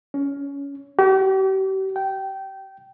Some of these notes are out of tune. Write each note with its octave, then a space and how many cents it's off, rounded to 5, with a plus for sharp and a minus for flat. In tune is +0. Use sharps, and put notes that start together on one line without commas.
C#4 +20
G4 -40
G5 -20